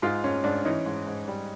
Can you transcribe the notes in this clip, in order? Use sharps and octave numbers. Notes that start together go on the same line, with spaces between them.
G#2 D#4 F4
G#2 C#4
G#2 D4
E3 C#4 D#4
G#2
G#2
G3